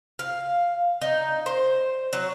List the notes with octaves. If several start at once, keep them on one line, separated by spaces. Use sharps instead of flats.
F5
D#4
C5
F#3